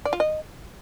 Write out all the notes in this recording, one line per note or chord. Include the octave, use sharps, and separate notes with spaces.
D5
F4
D#5